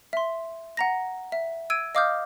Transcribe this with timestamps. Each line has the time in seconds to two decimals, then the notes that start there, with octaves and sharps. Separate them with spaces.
0.13 E5 C6
0.77 F#5 A#5 A#6
1.32 E5
1.70 E6 G#6 D7 D#7
1.95 D#5 F5 D6 D#6 F6 G6